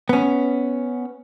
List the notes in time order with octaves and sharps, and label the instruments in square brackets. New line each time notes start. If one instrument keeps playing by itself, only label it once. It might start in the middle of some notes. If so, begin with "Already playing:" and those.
[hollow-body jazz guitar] B3 C#4